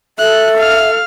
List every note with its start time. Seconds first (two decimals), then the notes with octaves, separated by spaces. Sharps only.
0.18 A4 E5 F#6
0.57 F5 F6